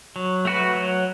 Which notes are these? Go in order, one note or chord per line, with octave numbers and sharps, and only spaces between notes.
F#3
A3 F#4 B4
F#3